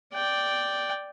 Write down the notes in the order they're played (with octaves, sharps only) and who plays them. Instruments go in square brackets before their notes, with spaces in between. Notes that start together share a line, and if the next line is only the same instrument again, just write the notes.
[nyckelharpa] D5 G5